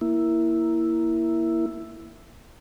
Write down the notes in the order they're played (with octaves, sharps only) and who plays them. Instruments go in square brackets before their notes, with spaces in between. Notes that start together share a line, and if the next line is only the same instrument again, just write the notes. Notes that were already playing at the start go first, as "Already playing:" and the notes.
[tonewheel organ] A#3 E4